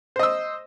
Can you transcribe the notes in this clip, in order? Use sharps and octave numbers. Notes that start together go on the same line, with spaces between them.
C5 D#5 E6